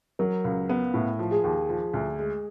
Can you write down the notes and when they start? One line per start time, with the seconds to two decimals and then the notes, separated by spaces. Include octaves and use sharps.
0.19 F#3 A#4
0.44 C#2
0.69 B3
0.94 A2
1.19 F3
1.31 G#4
1.44 D#2
1.69 F3
1.94 D2
2.19 G#3